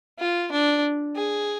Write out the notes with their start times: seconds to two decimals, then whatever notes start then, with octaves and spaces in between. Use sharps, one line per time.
0.19 F4
0.52 D4
1.16 G#4